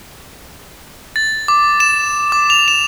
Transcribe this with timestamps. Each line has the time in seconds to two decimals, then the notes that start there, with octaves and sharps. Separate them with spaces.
1.16 A6
1.48 D6
1.80 E7
2.32 D6
2.50 F7
2.68 E7